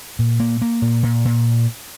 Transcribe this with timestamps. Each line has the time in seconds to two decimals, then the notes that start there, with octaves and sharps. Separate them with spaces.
0.19 A#2
0.40 A#3
0.62 A#3
0.82 A#2
1.03 A#2
1.25 A#2